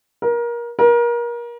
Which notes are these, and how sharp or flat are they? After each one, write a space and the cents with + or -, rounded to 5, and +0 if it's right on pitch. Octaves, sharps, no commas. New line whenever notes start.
A#4 +25
A#4 +30